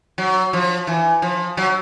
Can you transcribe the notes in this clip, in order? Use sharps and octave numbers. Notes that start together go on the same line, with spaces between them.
F#3
F3
E3
F3
F#3